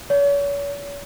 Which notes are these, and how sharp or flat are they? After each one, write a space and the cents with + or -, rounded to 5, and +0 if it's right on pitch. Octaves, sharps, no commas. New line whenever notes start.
C#5 +40